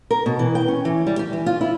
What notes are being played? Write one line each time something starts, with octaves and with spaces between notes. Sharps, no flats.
A#4
B2
E3
G5
C#4
E3
G3
G4
E3
F4
E4